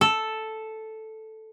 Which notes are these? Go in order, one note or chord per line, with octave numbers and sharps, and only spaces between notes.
A4